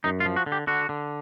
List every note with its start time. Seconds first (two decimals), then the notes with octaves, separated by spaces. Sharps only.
0.04 F#2 D#4
0.20 F4
0.25 F3
0.36 F#4
0.46 D3
0.52 G4
0.67 D3 F#4
0.89 D3